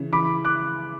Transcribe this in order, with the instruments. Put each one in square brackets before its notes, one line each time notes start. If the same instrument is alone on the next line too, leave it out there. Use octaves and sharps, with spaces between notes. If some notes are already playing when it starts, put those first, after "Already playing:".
Already playing: [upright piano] C#3 E3
[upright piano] E3 [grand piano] B5 D6
[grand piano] D6 F#6